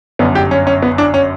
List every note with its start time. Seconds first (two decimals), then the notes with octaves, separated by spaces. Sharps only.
0.19 G1 F#2 D3 B3
0.35 G4
0.51 C#4
0.67 C#4
0.83 B3
0.98 D4
1.14 C#4